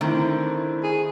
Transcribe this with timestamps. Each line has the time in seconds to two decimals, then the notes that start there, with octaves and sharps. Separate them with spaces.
0.01 D3 D#3 A3 C4 E4
0.83 G#4